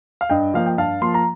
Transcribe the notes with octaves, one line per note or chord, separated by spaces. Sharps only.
F5
G2 D#5 G5
F3 A#3 F5
G5
G2 F5 A5
F3 A#3 C6
A#5